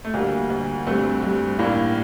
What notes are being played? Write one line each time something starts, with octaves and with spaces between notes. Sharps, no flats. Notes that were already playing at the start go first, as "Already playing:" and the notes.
A3
D2 G3 A#3
D2
G2 A3 C4
G2
A2 A#3 D4